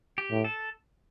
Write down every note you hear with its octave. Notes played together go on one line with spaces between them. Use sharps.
G4
A2
A4